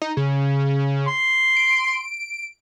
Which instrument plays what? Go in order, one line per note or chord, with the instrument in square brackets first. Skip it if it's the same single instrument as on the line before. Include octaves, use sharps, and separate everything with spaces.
[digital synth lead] D#4
C#3
[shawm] C6
[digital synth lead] D7